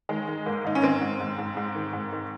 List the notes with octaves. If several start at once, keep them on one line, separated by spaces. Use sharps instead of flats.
D#3 G#3
D#3
G#2 A#3
G#2 D#4
C#4
D#3 C4
G#2
G#2
G#2
G#2
D#3
G#2
D#3